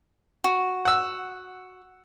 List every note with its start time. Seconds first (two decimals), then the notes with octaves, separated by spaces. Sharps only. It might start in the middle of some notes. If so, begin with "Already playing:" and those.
0.44 F#4
0.85 F#5 E6